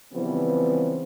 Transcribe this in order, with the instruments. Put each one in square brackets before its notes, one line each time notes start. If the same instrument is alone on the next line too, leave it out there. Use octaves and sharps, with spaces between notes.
[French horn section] C#3 E3 F3 G3 B3 C4